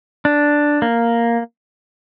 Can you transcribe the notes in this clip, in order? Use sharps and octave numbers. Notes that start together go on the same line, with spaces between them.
D4
A#3